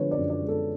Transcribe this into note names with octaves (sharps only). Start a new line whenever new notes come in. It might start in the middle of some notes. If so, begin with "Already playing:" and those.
Already playing: D3 F3 G#3 B4 C#5
D5
F#2
D5
G#3
A4